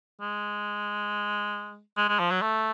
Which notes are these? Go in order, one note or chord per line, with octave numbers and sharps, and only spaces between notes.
G#3
G#3
G#3
F3
F#3
A3